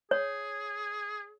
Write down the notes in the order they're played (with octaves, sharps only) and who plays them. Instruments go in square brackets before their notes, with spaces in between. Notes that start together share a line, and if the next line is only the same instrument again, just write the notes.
[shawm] G#4 [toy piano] C#5